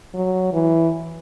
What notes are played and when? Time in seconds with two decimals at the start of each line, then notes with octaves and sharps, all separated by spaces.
0.14 F#3
0.53 E3